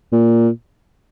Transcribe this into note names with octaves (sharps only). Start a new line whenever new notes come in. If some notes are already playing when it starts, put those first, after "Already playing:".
A#2